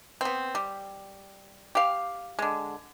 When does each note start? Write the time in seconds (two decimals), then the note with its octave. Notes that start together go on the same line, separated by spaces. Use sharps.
0.21 B3 C4
0.55 G3
1.75 G4 F5
2.39 D3 G#3